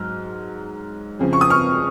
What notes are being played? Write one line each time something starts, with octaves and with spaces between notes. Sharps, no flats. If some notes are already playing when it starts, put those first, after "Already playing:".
Already playing: G#2 F#3 F6
F2 C#3 F3
C#6
D#6
C#6 F6